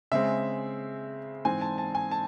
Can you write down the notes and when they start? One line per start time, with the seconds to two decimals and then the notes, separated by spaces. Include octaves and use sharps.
0.12 C#3 G#3 C4 E5
1.45 G#2 E3 C4 G#5
1.61 A5
1.78 A5
1.95 G#5
2.11 A5